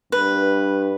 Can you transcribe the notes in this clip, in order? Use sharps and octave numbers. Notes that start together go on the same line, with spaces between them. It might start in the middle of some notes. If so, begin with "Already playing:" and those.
G2 B4